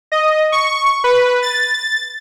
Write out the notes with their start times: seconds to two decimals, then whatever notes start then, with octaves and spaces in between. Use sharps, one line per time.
0.12 D#5
0.52 C#6
1.04 B4
1.42 A6